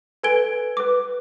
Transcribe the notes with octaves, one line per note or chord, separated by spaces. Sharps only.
A4 B4 G#5 G#6 D7 G7
B4 D6